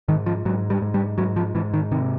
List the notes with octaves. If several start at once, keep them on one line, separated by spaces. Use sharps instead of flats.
G#2 D#3
F3
G#2 F#3
G3
G#2
G3
G#2 F#3
F3
G#2 E3
D#3
C3 D#3